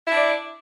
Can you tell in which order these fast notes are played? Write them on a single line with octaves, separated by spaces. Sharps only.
E4 D4 D5